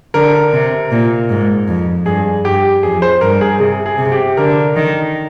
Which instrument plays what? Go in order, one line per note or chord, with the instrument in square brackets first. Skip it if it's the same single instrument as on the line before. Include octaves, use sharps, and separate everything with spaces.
[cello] D3 [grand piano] A#4
[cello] C3
A#2
G#2
F2
[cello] G2 [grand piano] G#4
[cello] G2 [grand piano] G4
[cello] F2 [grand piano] G#4
[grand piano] C5
[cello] G2 [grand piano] A#4
[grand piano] G#4
[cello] C3 [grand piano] G#4
[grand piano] G#4
[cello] C3
[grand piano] G4
[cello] D3 [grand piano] A#4
[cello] D#3